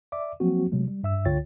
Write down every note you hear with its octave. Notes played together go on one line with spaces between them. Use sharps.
D5 E5 D6
F3 F#3 A#3 C4 F#4
C3 F#3 G#3 A3
G3
G2 E5 E6
C#2 D3 F4 C#5 G5 A6